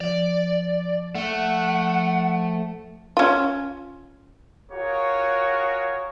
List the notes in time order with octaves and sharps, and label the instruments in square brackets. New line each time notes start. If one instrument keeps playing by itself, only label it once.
[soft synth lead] F3 [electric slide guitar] D5
[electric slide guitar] A3 [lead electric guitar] F#5
[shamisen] C#4 F4
[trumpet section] F4 F#4 G#4 A#4 C#5